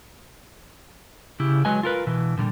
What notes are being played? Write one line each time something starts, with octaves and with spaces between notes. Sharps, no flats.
C#3 E4 G4
F#3 G#3 B4 D#5 G#5
F4 A#4 B4
B2 E3
A#2 D3 F3 G3